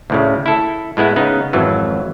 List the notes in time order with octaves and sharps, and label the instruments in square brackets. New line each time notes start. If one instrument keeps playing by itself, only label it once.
[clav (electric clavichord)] D2 A2 C#3
E4 A4
A2 G#3 B3 E4
C#3 B3 D#4
G#1 F2 E3 F#3